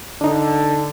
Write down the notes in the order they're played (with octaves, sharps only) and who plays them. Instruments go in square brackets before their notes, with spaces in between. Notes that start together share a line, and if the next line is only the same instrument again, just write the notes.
[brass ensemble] D3 [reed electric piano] D4 D#4